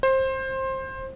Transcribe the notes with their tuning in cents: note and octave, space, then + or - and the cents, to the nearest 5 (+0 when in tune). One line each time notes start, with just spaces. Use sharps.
C5 +20